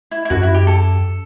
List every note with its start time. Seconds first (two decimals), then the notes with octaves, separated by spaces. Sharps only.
0.11 E4
0.25 E4
0.30 F#2 F#4
0.38 G2
0.43 F#2 E4
0.54 G4
0.67 A4